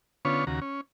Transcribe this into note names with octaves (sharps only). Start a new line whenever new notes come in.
D3 B3 C#4 F4 C#5
D#2 C#3 F#4 A#5
C#4